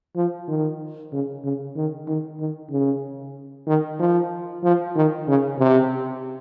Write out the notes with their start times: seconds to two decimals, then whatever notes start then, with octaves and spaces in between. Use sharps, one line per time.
0.16 F3
0.48 D#3
1.12 C#3
1.44 C#3
1.76 D#3
2.08 D#3
2.40 D#3
2.71 C#3
3.67 D#3
3.99 F3
4.64 F3
4.96 D#3
5.28 C#3
5.59 C3